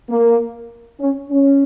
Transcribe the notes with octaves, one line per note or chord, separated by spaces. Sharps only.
A#3
C#4
C#4